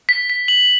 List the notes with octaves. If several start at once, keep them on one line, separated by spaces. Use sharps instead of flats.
B6
B6
F#7